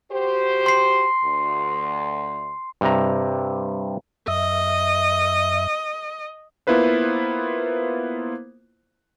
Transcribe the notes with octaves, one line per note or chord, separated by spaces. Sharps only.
F#4 G4 C5
C6 C7
D2
G2 C3 A#5
F#2 D#5 E5
A#3 B3 E4 F4 B4 C5